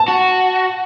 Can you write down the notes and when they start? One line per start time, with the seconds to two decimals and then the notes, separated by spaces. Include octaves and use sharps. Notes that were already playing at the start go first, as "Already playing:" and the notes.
Already playing: A5
0.08 F#4